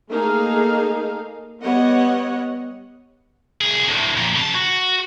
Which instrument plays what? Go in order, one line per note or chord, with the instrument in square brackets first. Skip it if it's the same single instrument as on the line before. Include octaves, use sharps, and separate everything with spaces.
[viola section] A3 A#3 D#4 G#4 A4 F5
G3 B3 C#5 D#5 F#5
[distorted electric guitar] C2 G#4
D2 A2
F2 A#2
C#3 A5
F#4